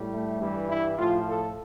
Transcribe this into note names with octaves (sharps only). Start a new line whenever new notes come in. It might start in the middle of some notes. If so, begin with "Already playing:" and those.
Already playing: A2 G3
A3
G2 E3 G3
E4
A2 F3 F4
A4